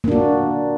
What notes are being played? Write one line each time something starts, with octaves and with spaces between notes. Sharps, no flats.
A#3 D4 F#4